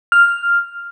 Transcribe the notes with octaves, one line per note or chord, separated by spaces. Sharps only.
F6